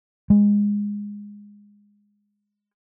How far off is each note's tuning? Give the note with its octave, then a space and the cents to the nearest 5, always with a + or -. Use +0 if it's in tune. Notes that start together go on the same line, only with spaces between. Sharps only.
G#3 -15